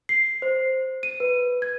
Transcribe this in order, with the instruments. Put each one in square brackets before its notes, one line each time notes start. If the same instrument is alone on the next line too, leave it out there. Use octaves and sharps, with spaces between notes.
[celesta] C7
C5
D#7
B4
G#6